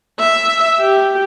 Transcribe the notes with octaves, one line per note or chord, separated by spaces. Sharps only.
E5
G4